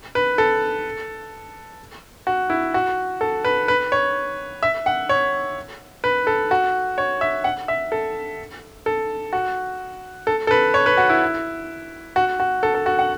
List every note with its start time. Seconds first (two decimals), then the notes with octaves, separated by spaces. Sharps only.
0.15 B4
0.38 A4
2.27 F#4
2.50 E4
2.74 F#4
3.21 A4
3.45 B4
3.68 B4
3.92 C#5
4.63 E5
4.86 F#5
5.09 C#5
6.04 B4
6.27 A4
6.51 F#4
6.98 C#5
7.21 E5
7.44 F#5
7.68 E5
7.92 A4
8.86 A4
9.33 F#4
10.27 A4
10.47 A4
10.51 B4
10.74 C#5
10.86 B4
10.97 F#4
11.09 E4
12.16 F#4
12.40 F#4
12.63 A4
12.74 A4
12.86 F#4
12.99 F#5